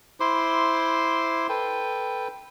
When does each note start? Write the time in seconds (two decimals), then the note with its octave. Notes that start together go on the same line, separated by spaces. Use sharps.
0.20 E4 C5 C6 D6
1.49 A4 B4 G5